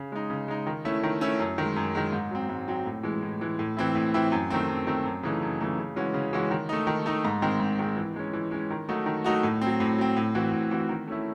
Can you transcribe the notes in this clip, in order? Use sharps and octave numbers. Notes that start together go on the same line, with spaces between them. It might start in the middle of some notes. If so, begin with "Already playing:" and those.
Already playing: C#3
G#3 D#4
C#3
G#3 D#4
D#3
A3 C#4 E4
D#3
A3 C#4 E4
F#2
D#3 G#3
F#2
D#3 G#3
G#2
F#3 C4
G#2
F#3 C4
A2
E3 G#3
A2
E3 G#3
A2
E3 C4 E4
A2
E3 C4 E4
F#2
D#3 A3 C4
F#2
D#3 A3 C4
F#2
C#3 E3 A3 D#4
F#2
C#3 E3 A3 D#4
C#3
E3 G#3 C#4 F#4
C#3
E3 G#3 C#4 F#4
D#3
A3 D#4
D#3
A3 D#4
G#2
D#3 G#3 C4
G#2
D#3 G#3 C4
E3
G#3 C#4
E3
G#3 C#4
D#3
F#3 A3 D#4 F#4
D#3
F#3 A3 D#4 F#4
A2
F#3 C4
A2
F#3 C4
A2
E3 C4 F#4
A2
E3 C4 F#4
D#3
A3 C#4 E4